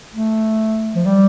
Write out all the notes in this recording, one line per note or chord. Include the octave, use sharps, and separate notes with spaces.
A3
F3
G3